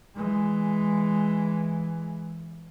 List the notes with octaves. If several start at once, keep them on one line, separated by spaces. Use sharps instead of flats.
E3 G#3